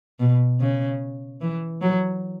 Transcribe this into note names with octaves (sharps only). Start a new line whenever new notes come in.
B2
C#3
E3
F#3